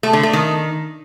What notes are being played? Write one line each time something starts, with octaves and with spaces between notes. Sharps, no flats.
A3
D3
A3
D#3